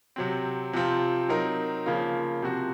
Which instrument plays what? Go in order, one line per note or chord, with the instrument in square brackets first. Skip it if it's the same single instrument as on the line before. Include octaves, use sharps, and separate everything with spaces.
[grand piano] C3 F#3 C4
C3 F3 C4 F4
F#3 C4 D#4 A#4
C#3 F3 A#3 F4
C3 F3 C4 F#4